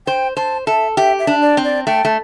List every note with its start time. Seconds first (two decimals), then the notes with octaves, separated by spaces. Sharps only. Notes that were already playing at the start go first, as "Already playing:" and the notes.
0.07 C5 G5
0.37 C5 A5
0.67 A4 E5
0.97 G4 E5
1.19 E5
1.27 D4
1.42 D5
1.57 C4
1.64 D5
1.87 A3 G5
2.05 A3